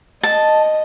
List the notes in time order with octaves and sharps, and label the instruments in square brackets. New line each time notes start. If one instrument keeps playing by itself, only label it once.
[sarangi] D#5 [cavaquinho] A5